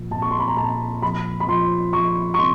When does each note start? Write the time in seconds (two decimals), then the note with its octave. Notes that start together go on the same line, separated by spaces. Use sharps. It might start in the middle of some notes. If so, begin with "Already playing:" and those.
Already playing: A#2 F3
0.11 A#2 A5
0.22 C#6
0.31 C6
0.40 B5
0.48 A#5
0.56 A#2 A5
1.02 F3 B5
1.40 B5
1.48 F3 C6
1.93 F3 C#6
2.34 C#6
2.39 C3 C6